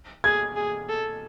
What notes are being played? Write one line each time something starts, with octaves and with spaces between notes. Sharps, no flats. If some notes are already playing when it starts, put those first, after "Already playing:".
G#4 G#6
G#4
A4